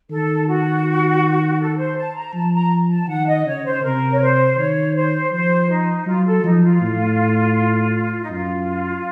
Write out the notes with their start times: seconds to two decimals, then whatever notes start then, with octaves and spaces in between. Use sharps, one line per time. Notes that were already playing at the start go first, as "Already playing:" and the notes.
0.10 D#3 A4
0.47 F#4
1.60 A4
1.77 C5
1.96 A5
2.15 A#5
2.34 F3 A5
2.53 A#5
2.89 A5
3.08 D#3 F#5
3.27 D#5
3.46 C#3 C#5
3.65 C5
3.83 C3 A#4
4.11 C#5
4.20 C5
4.57 D#3 C#5
4.94 C5
5.32 F3 C5
5.70 D#4
6.06 F#3 F4
6.25 A4
6.44 F3 D#4
6.63 F4
6.82 A2
8.22 D#4
8.30 F#2 F4